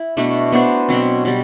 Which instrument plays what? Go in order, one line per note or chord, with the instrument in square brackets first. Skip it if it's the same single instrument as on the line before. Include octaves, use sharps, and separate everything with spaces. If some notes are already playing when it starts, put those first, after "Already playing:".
Already playing: [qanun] E4
B2 A3 D4
B3 D4 F#4 C5
B2 F#3 C4
B2 G3